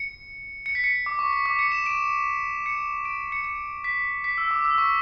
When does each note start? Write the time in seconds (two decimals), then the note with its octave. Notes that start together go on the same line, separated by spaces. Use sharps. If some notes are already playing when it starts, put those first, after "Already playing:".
Already playing: C#7
0.66 C#7
0.75 B6
0.84 C#7
1.06 D6
1.19 C#6
1.33 C#6
1.46 D6
1.59 C#7
1.72 E7
1.86 D7
2.66 C#7
3.05 D7
3.32 C#7
3.45 C#7
3.84 B6
4.24 B6
4.38 E6
4.51 D6
4.65 E6
4.78 C#6